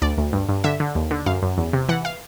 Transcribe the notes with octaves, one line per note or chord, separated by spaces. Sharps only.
D2 D5
D2
G2
G2
D3 E5
D3
D#2
D3
F#2 F5
F#2
E2
C3
E3 F#5
F5